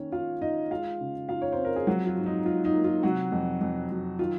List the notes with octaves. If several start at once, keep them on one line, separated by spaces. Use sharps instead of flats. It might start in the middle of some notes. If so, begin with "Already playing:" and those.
Already playing: D#3 A#3 C#4 C#5
D#3 F4 F5
D#4 D#5
G#3 F4 F5
C#3
D#4 F4 F5
C#5
C4 C5
A#4
G#4
F3 F#3 F#4
F4
G#2
D#4
G#2 F4
D#4
A#3
F4
C3 F#3 F#4
F2
F2
F#3
D#3 F4